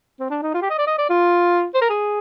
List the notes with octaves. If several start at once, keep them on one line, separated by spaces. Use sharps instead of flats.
C4
D4
D#4
F4
G4
D#5
D5
D#5
D5
F4
C5
A#4
G#4